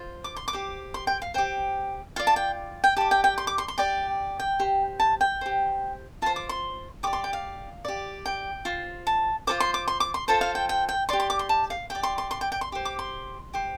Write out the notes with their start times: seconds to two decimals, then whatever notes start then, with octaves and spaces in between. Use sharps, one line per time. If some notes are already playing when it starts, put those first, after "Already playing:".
Already playing: F4 C5
0.24 D6
0.36 C6
0.48 D6
0.53 G4 C5
0.94 C6
1.07 G5
1.22 F5
1.34 G4 C5 G5
2.16 F4 D5 F5
2.27 A5
2.36 G5
2.84 G5
2.97 G4 D5 A5
3.11 G5
3.24 G5
3.38 C6
3.47 D6
3.58 C6
3.68 C6
3.78 G4 D5 G5
4.40 G5
4.60 G4 C5
5.00 A5
5.21 G5
5.41 G4 C5
6.22 F4 C5 A5
6.36 D6
6.49 C6
7.03 G4 D6
7.07 D5
7.13 C6
7.24 G5
7.33 F5
7.85 G4 D5
8.26 G5
8.65 F4 C5
9.07 A5
9.47 F4 A4 C5 D6
9.60 C6
9.74 D6
9.88 C6
10.00 D6
10.14 C6
10.28 F4 A4 C5 A5
10.41 F5
10.55 G5
10.69 G5
10.89 G5
11.09 G4 D5 C6
11.20 C6
11.30 D6
11.39 C6
11.49 A5
11.70 F5
11.90 G4 D5 G5
12.03 C6
12.18 C6
12.31 C6
12.41 G5
12.52 G5
12.61 C6
12.72 G4 C5
12.85 D6
12.99 C6
13.54 G4 C5